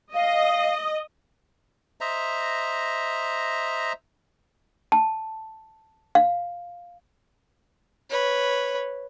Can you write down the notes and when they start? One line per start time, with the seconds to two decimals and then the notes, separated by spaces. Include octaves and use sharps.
0.14 D#5 F5
2.01 C5 D#5 E5 A#5
4.92 A5
6.15 F5
8.10 B4 C#5